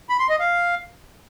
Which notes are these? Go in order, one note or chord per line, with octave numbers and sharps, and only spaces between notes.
B5
C6
D#5
F5